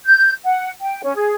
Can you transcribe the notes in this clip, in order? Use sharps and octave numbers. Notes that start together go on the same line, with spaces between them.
G6
F#5
G5
C#4
G#4